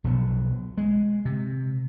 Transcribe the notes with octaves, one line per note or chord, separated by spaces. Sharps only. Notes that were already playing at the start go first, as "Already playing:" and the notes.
B1 F3 F#3
G#3
C3